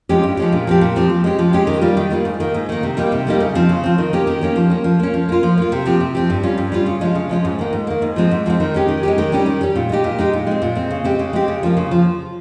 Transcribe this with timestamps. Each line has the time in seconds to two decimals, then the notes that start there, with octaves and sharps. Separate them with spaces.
0.09 F3 G#3 C#4 G4
0.23 G2
0.37 F3 G#3 C#4 G4
0.52 A#2
0.67 F3 C4 G4
0.81 A#2
0.96 F3 C4 G4
1.09 F3
1.24 G#3 C#4 G4
1.39 F3
1.53 G#3 C#4 G4
1.67 D#3
1.82 G3 A#3 F4
1.97 D#3
2.10 G3 A#3 F4
2.25 G#2
2.40 D#3 A#3
2.54 G#2
2.69 D#3 A#3
2.83 C3
2.97 G3 A#3 D#4 G4
3.12 C3
3.27 G3 A#3 D#4 G4
3.40 C#3
3.55 F3 C4
3.69 C#3
3.84 F3 C4
3.98 D#3
4.13 A#3 C#4 G4
4.27 D#3
4.41 A#3 C#4 G4
4.56 F3
4.70 A#3 C#4
4.84 F3
5.00 A#3 C#4
5.14 F3
5.29 A#3 F4
5.43 F3
5.58 A#3 F4
5.72 C3
5.86 F3 C4 G4
6.01 C3
6.15 F3 C4 G4
6.30 G2
6.43 G3 C#4 F4
6.58 G2
6.72 G3 C#4 F4
6.86 C#3
7.01 F3 G#3 C#4
7.15 C#3
7.29 F3 G#3 C#4
7.45 G#2
7.59 D#3 A#3
7.73 G#2
7.87 D#3 A#3
8.02 G#2
8.16 F3 G#3 C4
8.31 G#2
8.46 F3 G#3 C4
8.60 D#3
8.74 G#3 C#4 G4
8.88 D#3
9.03 G#3 C#4 G4
9.18 D#3
9.32 G3 C#4 G4
9.46 D#3
9.61 G3 C#4 G4
9.76 A#2
9.89 G#3 D#4 G4
10.04 A#2
10.19 G#3 D#4 G4
10.33 A#2
10.47 G#3 C4
10.62 A#2
10.75 G#3 C4
10.91 C#3
11.04 G#3 C4 G4
11.19 C#3
11.33 G#3 C4 G4
11.48 C#3
11.63 F3 A#3
11.77 C#3
11.91 F3